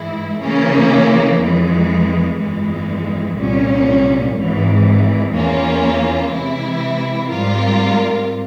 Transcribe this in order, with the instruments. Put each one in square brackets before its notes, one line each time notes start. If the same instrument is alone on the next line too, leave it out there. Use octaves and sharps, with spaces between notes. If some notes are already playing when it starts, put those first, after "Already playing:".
Already playing: [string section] G#2 E3 G#3 E4
C#3 E3 A#3 C#4
F2 E3 G#3
G1 F2 E3 G#3
C2 A#2 G3 C#4
G#1 G#2 E3
E2 E3 A#3 C#4 F4
C3 E3 G#3 E4
G#2 G3 C4 F4 A#4